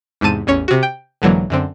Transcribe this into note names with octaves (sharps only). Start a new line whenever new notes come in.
E2 G#2 C3 A5 D#7
A1 E2 C#4 C#5
C3 F#4
G5
B1 G#2 D3 E3 F#3 A#3
F#2 D3 C4